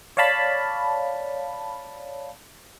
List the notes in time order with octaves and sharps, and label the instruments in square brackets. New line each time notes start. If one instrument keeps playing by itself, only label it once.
[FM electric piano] C#5 D5 F5 A5 B5